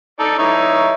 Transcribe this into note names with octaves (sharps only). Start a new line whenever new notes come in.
D#4 A4 D5
D#4 E4 C#5